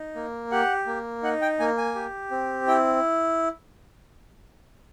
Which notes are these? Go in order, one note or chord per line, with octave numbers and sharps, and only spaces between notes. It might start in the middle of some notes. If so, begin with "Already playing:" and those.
Already playing: D#4
A#3
G4 F#5
A#3
D#4 F#5
G5
A#3 G#5
G#5
G4
C4
E4 G5